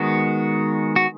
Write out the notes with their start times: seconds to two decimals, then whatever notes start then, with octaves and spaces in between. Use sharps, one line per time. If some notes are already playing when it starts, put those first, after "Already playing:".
Already playing: D#3 G#3 B3 F#4
0.96 F#4